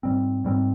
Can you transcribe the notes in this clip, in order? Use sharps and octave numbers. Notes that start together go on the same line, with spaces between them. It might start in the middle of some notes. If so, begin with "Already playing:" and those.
G#2 G3 C4
G#2 G3 C4